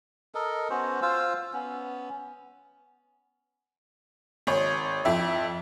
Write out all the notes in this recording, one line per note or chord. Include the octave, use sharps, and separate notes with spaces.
A4 A#4 D#5
B3 C#4 F#4 C5
F4 C5 F5 E6
B3 C#4
G#1 C#5
F2 E5